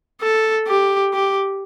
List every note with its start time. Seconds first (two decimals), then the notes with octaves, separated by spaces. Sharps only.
0.22 A4
0.67 G4
1.13 G4